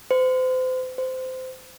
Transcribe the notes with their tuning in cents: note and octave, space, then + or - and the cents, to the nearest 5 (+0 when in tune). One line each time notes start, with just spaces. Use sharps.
C5 -35
C5 -20